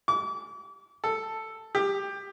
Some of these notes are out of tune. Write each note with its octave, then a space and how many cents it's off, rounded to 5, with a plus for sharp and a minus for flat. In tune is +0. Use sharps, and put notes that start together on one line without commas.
D6 -40
A4 +5
G4 +15